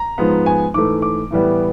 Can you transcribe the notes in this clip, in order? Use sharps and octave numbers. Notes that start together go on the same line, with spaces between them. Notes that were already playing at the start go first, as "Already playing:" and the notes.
Already playing: A#5
G#2 F3 G#3 B3
G#5
G#2 E3 A3 D6
D6
A2 E3 G3 B3